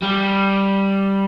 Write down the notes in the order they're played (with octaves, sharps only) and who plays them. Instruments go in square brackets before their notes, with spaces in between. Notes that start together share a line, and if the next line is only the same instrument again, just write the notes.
[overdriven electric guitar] G3